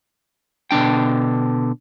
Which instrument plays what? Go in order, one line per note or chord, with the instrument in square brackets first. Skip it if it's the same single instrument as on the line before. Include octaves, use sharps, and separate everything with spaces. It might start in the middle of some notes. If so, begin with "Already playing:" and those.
[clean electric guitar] B2 D3 D4 G5